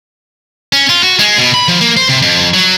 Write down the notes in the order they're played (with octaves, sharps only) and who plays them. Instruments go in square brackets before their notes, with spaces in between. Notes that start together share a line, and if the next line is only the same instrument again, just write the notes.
[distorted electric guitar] C#4
F4
F#4
G#3
B2
B5
F3
A#3
C5
C3
F2
F#3